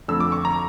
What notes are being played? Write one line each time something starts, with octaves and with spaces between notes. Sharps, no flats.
F2 D3 A3 E6
D6
C#6
A#5